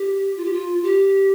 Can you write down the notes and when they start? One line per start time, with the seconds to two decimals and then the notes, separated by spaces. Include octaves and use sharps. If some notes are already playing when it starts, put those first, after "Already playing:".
Already playing: G4
0.37 F4
0.45 G4
0.53 F4
0.84 G4